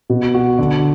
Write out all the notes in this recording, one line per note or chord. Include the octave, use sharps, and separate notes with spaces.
B2
F#4
D3